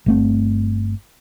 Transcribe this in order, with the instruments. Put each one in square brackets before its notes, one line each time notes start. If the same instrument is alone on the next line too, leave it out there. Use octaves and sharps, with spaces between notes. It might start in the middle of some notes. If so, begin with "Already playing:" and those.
[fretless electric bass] G1 A3 C4